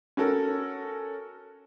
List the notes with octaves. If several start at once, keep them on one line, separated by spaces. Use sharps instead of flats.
C#4 F#4 A4 A#4